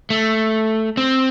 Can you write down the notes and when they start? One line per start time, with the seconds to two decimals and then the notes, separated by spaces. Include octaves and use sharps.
0.10 A3
0.97 C4